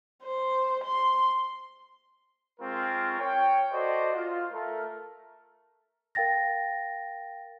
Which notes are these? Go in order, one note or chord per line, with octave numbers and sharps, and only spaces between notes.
C5
C6
G#3 C4 F4 A#4 C#6
C#5 G5
F#4 A4 C5 D5 D#5
F4
A3 A#4
A#4 F5 G5 A6 A#6